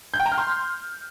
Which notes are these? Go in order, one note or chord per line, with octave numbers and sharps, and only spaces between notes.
G6
G5
A#5
F6
C6